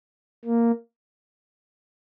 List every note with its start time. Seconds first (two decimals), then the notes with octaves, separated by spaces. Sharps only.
0.45 A#3